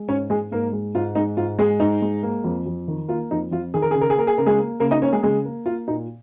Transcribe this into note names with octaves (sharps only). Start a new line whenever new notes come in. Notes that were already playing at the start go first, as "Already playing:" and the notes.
Already playing: G#3
G#2 C#4 C#5
G#3 G#4
G#2 A#3 A#4
G#3
G#2 F4
G#3 D#4
G#2 F4
G#3 G#4
G#2 D#4
G#3
A#3
F2
F2
D#3
A#3 F4
F2 D#4
F2 F4
D#3 G#4
A#4
C#3 G#4
A#4
G#4
A#3 A#4
G#4
C#3 A#4
G#3 G#4
A#3
C#3 A#3 A#4
D#4 D#5
A#3 C#4 C#5
G#3 G#4
C#3 G#3 G#4
A#3
A#3 F4
A#2 D#4